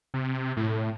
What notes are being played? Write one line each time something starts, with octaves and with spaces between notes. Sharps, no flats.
C3
A2